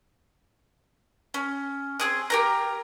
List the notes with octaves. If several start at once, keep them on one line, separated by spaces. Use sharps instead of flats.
C#4
C4 G#4 D#6
G4 A#4 A#5